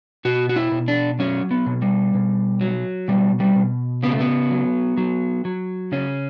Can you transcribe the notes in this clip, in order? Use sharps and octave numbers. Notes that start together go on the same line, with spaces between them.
B2 F#4
F#4
E4
B2
D4
F#3 C#4
B3
B2
G3
B2
F#3
B2 G3
G3
B2
C#3 B3
A3
B3
F#3
F#3
F#3
C#3 C#4